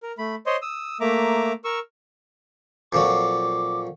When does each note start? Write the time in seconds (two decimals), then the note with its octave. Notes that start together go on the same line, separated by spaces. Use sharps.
0.03 A#4
0.18 A3 B5
0.46 C5 C#5 D#5 C6
0.62 D#6 E6
1.01 A3 A#3 E5 A#5 D6
1.64 A#4 C#6 E6
2.93 F2 A#2 F#3 D6